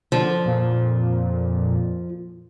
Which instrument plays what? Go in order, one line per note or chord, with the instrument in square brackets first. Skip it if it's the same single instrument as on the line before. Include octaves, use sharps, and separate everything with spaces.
[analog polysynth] D3 [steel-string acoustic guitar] F3
[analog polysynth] F2 A#2